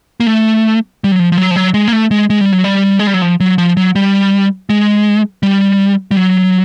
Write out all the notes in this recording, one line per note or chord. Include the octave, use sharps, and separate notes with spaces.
A#3
A3
G3
F#3
F3
F3
F#3
F3
F#3
G#3
A#3
A3
G#3
G#3
G3
F#3
G3
G#3
G3
F#3
F3
F#3
F3
F#3
G3
G#3
G3
G3
F#3